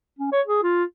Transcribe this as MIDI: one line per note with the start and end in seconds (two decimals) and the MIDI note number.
0.19 0.31 61
0.32 0.41 73
0.47 0.63 68
0.63 0.84 65